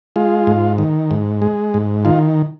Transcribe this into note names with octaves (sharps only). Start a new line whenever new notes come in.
G#3 F4
G#2
D#3
G#2
G#3
G#2
D#3 F4